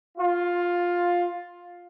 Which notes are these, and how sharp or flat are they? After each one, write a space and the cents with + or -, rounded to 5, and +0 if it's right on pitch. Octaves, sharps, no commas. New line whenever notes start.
F4 +10